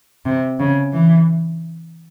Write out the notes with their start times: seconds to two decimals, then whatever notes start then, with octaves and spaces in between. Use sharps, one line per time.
0.25 C3
0.59 C#3
0.93 E3